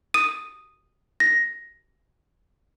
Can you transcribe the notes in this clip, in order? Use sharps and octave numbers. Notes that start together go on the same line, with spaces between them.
D#6 D#7
A#6